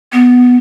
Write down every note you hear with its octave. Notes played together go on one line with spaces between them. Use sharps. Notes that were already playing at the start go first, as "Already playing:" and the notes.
B3